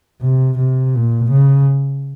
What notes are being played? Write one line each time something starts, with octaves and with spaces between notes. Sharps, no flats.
C3
C3
A#2
C#3